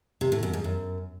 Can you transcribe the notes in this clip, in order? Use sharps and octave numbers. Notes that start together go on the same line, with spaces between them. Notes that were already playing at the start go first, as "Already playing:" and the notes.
C3
A2
F#2
G#2
F#2